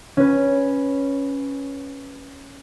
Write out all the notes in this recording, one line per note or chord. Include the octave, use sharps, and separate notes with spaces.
C#4 B4